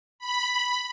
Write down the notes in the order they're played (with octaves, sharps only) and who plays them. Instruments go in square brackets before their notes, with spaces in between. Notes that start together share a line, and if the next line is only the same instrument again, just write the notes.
[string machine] B5